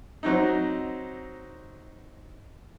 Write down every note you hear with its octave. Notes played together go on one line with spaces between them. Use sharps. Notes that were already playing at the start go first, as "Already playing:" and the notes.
F#3 C4 D#4